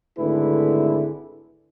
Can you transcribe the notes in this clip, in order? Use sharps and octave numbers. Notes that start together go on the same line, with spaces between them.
G#1 D3 A3 E4 G#4 B4